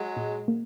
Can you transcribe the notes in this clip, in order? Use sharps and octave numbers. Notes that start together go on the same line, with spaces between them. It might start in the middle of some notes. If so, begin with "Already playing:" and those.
Already playing: F#3 G#3
A#2
A#3